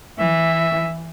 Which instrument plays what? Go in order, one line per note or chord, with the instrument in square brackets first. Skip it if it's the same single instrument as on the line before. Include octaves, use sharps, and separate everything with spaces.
[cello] E3 [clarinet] E5